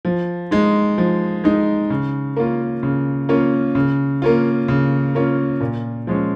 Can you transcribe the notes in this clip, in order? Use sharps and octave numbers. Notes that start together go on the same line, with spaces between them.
F3
G#3 D#4
F3
G#3 D#4
C#3
A#3 C#4 F4
C#3
A#3 C#4 F4
C#3
A#3 C#4 F4
C#3
A#3 C#4 F4
A#2
F3 G#3 C#4